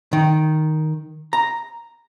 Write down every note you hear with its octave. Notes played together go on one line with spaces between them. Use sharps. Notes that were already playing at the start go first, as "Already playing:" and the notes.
D#3
A#5